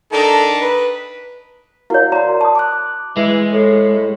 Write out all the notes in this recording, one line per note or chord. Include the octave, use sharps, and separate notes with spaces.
D#3 D4 D#4 A4
B4
E4 F#4 A#4 C#5 F5
D5 A#5 C6
A5 D#6
D6 F#6
E3 G#3
A2